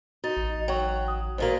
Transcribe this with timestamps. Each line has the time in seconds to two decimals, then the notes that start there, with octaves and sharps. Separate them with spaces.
0.24 D#4 F#4 A6
0.37 A1
0.68 F#3 G5 C#6
1.08 D#6
1.38 D#2 A#2 A#3 F#4 C5